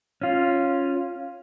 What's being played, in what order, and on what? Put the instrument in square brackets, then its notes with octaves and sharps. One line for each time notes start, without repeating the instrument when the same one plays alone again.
[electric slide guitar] C#4 F4